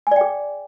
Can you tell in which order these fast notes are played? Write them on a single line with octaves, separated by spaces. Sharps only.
G#5 D5 G5 G#4